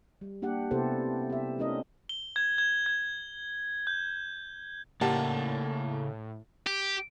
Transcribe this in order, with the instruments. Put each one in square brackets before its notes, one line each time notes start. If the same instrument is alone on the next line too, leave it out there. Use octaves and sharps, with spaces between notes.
[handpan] G3
A#3 D4 G4 F#5
C3 B3 E4 G4 A4 C5
G4 E5
A3 C#4 D4 E4 A#4 D#5
[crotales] G7
G#6
G#6
G#6
G6
[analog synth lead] A2 [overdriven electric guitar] C#3 D5 [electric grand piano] A#3 A5 [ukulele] G4 F#5
[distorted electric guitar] G4